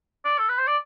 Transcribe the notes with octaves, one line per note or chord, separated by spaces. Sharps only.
D5
A4
B4
C5
D5